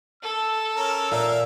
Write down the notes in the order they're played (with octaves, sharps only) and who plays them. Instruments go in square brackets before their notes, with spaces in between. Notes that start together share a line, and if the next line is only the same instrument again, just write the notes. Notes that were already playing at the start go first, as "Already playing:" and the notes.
[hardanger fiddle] A4 [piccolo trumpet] E6
[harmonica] C#4 A#4
[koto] A#2 [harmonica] A#4 E5 F5